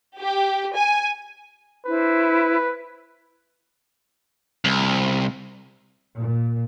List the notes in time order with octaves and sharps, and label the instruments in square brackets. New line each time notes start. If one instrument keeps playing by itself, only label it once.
[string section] G4
G#5
[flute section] D4 E4 C5 [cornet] B4
[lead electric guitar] C2
[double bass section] A#2